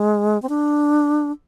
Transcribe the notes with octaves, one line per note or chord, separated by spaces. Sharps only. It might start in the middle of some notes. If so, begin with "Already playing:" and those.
Already playing: G#3
C4
D4